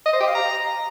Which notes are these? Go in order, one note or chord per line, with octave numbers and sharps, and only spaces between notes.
D#5
C5
G4
F5
A#5